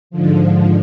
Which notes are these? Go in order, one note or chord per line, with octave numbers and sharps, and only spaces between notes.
G#2 D3 F3